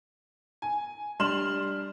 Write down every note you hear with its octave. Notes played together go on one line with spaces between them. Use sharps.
G#5
G3 D4 C6 F6 E7 F#7